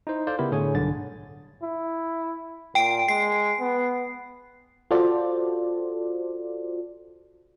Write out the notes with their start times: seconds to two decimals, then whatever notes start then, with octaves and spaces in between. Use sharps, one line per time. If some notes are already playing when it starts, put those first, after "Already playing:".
0.07 D#4 E4 C5
0.27 A4 C5 D5 F5
0.39 C#3 B3 E4 G4 A#4
0.51 A2 D3 G#4 C#5 G#5
0.75 B1 G2 D3 A6
1.63 E4
2.75 A#2 G5 D7
3.08 G#3 C7
3.60 B3
4.91 F4 F#4 A4 C5 D5